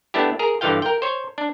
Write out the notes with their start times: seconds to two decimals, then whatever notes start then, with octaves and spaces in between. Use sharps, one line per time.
0.14 A3 B3 D4 E4 G4
0.39 G#4 A#4 A#5
0.61 G2 D3 E3 F4 F5 G5
0.82 A#4 G5
1.02 C5 C#5
1.38 D4